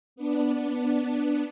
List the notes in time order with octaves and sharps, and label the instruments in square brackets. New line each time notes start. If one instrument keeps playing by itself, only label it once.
[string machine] B3 D4